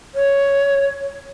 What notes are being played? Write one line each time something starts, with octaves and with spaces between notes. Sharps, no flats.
C#5